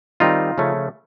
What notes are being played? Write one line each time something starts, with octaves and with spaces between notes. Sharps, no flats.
D#3 G3 C4 D#4 F4
C#3 F3 A3 C#4